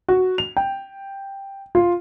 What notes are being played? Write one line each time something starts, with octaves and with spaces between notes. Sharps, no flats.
F#4
F7
G5
F4